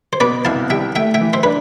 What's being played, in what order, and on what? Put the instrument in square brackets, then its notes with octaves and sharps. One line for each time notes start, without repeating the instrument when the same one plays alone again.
[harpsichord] C5
[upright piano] B2 [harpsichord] B4 D5
[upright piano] C2 [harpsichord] F5 A5
[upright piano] G3 [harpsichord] E5 G5
[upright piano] A3 [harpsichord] E5 G5
[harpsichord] E5 G5
[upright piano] E3
[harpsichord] C5 E5
[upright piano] D4 [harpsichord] B4